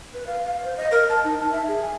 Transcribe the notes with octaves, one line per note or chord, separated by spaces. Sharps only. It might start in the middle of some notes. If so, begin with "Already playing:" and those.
B4
F5
F5
C5
D#5
A#4
A5
D#4
A5
E5
G#4
G#5